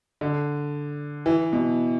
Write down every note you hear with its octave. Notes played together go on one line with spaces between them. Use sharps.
D3
E3
B2